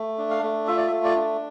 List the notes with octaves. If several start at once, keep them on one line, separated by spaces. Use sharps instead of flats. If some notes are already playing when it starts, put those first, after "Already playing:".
Already playing: A3
D4
F5
A3
F4 E5
D5
E5
A3
D5
D4